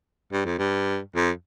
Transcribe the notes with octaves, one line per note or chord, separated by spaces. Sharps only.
G2
F2
G2
F2